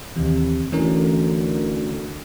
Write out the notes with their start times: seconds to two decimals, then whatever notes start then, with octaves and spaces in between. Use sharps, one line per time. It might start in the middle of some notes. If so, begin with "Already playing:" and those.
0.16 D#2 C3 E3
0.72 D2 E3 C#4 A#4